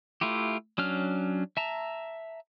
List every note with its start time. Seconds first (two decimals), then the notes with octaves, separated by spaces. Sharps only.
0.21 A3 E4 F4 G4
0.78 F#3 C#4 D4 F6
1.57 E5 A5 A#5